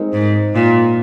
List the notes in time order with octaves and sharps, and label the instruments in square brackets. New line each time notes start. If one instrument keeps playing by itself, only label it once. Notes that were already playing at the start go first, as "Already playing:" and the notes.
Already playing: [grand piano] G#3 C4 D#4 A#4
[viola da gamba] G#2
A#2